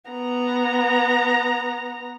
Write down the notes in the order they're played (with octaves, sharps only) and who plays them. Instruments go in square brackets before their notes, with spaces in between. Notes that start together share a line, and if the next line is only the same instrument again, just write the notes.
[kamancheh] B3 A#5